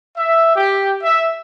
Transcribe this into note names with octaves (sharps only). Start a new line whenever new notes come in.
E5
G4
E5